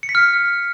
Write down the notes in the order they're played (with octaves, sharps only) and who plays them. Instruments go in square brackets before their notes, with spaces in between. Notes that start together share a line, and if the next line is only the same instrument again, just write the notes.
[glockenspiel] C#7
B6
F6